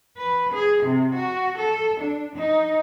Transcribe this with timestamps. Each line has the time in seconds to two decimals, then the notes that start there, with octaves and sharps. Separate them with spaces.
0.17 B4
0.53 G#4
0.84 C3
1.15 F#4
1.58 A4
2.01 D4
2.36 D#4